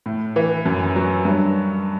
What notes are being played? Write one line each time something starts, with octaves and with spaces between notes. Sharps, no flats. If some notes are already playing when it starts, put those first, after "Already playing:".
A2
E3
F#2
F#3
G2